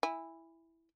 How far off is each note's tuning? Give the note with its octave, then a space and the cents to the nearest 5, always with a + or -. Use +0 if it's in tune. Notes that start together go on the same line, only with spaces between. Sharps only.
E4 +0 G#5 -25